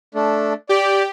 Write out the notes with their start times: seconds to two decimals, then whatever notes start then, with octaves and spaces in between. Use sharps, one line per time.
0.15 A3 D4
0.69 G4 D5